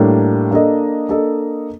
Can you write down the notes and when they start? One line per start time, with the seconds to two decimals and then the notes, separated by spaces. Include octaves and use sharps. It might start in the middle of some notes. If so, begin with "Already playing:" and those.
Already playing: A2 G3 A#3 D4
0.51 A#3 D4 A4 D#5
1.09 A#3 D4 A4 D#5